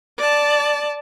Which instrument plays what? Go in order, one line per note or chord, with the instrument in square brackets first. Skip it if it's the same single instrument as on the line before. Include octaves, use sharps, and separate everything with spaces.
[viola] D5 A5